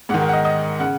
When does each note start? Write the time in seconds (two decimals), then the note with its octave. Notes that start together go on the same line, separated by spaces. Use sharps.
0.09 G#2 D#3 F#5
0.21 A#4
0.28 F#5
0.33 D#5
0.45 D#5
0.79 C#3 F#5